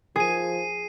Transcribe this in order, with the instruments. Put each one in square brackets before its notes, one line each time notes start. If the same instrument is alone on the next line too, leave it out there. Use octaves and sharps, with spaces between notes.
[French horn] F3 [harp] G#4 [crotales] C7 D#7